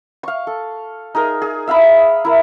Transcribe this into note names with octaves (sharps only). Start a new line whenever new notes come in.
F5 C#6
A4
D#4 G#4 A#4
G#4
E5 F5 A#5 B5
E4 A#4